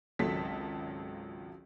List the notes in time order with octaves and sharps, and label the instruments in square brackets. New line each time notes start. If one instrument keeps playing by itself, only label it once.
[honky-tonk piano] G#1 C#2 F#3 A4 A5 B6